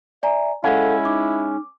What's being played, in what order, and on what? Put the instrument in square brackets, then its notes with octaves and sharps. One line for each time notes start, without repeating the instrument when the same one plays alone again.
[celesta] D5 G#5 A#5 [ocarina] E5
[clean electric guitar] G#3 C#4 [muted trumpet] E4 [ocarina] A4 [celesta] F5 F#5
[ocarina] D#4 [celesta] D6